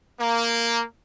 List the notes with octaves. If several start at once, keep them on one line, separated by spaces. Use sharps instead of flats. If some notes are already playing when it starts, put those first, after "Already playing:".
A#3